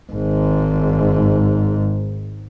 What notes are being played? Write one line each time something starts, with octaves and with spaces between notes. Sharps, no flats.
G#1 G#2